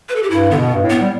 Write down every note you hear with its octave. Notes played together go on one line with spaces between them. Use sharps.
B4
A4
G4
G2 E4
D3 B3
B2
G2
A2
B3
G3